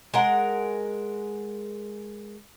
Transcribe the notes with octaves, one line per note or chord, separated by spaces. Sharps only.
G#3 A#4 F#5